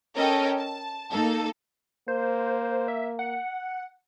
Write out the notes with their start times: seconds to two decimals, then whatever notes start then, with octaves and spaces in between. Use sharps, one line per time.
0.17 C#4 A4 A#4 C#5 D#5 G5
0.58 A5
1.11 A#3 D#4 A4
2.08 A#3 C5
2.88 E5
3.19 F#5